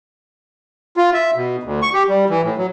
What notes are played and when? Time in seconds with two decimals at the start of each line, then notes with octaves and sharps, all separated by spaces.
0.97 F4
1.14 E5
1.36 B2
1.63 D2
1.82 C#6
1.93 G4
2.09 G3
2.30 E3
2.43 A2
2.57 F#3